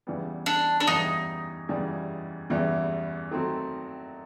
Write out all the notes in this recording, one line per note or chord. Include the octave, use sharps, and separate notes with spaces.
E2 C#3 E3 G3 B3
D4
D4
E2 C#3 E3 G3 B3 D#4
E2 C#3 E3 G3 B3
E2 C#3 E3 G3 B3
D#3 F#3 A3 C4